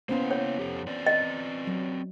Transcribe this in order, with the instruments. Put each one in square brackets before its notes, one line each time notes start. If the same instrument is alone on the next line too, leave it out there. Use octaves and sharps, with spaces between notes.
[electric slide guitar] A#3 E4 F5 [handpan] B3 C#4 C5
[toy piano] C#5
[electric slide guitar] F2 G4 A4
C4 B4 D5
[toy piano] D#5
[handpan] F#3